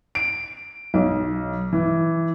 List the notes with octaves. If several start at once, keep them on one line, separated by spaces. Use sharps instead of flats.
D7
B1
E3